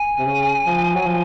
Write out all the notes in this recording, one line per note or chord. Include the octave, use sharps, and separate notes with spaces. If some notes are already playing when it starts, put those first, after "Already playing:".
Already playing: G#5
C3
C#3
F3
F#3
F3